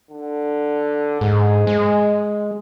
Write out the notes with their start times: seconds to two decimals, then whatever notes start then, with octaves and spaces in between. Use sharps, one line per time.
0.10 D3
1.21 G#2 G#4
1.67 G#3